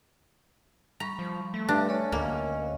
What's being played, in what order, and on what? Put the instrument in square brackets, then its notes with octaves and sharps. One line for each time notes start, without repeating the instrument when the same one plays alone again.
[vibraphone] G3 B5 C#6 [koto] A#5
[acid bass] F3
[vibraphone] G3 [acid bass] A3
[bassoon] G2 [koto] D4
[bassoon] C#4 [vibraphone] A4 D5
[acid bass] D2 [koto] A#3 [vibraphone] D#5 F5